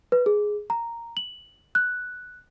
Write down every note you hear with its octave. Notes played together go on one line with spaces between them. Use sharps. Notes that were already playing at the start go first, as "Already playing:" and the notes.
B4
G#4
A#5
F#7
F#6